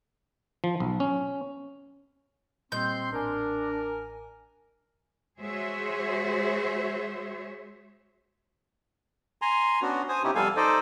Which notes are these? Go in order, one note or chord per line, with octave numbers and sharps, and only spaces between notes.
F3
B1
C#4
A#2 G3 C4 D#5 C6 G6
A1 D4 A#4 G#5
G#3 F#4 G#4 C5 C#5 E5
G#5 A#5 C6
B3 C#4 D4 F#4
C5 G#5 D#6
C3 B3 C#4 D#4 E4 G4
F2 G3 B3 A4 F5 G#5
D#4 A4 C5 D5 D#5